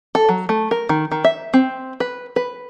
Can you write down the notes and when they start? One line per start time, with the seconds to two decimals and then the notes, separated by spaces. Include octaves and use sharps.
0.15 A4
0.29 F#3
0.49 A3
0.71 A#4
0.89 D#3
1.11 D#3
1.24 E5
1.54 C4
2.00 B4
2.36 B4